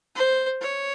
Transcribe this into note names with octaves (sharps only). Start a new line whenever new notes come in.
C5
C#5